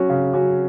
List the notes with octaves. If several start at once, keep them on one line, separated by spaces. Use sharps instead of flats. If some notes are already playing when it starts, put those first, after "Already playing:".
Already playing: F#3 C#4 F#4
C#3
F#3 C#4 F#4